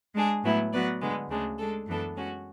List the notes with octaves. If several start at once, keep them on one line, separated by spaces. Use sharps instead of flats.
G#3 D4 G#4
A2 F#3 B3 E4
F#3 B3 F#4 B4 D5
D3 G#3 B3
D2 C#3 G#3 D4
G#3 D4 A4
F#2 E3 B3 D4 A4
G#3 C#4 F#4